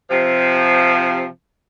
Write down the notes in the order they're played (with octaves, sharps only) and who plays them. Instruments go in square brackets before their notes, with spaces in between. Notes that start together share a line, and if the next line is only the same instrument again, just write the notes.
[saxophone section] C3 F3